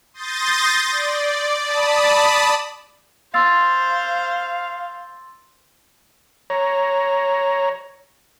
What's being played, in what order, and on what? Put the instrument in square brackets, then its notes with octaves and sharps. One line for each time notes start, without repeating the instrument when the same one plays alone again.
[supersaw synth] C6 D#6 G6 A6 A#6
D5
D5 A5 B5 D#6
[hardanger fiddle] C5 [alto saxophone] F5 [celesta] C6 E6 A6
[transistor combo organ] C#5 A#5